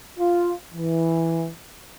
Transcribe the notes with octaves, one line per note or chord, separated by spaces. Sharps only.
F4
E3